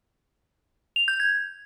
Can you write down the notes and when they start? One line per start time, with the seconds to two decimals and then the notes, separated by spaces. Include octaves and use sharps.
0.96 F7
1.08 G6
1.20 G#6